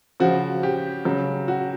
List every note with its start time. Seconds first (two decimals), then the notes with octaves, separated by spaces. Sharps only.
0.20 C#3 F3 F#4
0.63 G4
1.05 C#3 F#3
1.48 F#4